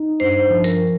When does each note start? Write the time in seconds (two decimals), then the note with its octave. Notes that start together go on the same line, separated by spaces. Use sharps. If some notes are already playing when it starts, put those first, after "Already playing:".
Already playing: D#4
0.20 G2 C5
0.50 F3
0.64 A#4